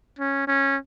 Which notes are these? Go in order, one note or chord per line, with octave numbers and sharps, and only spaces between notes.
C#4
C#4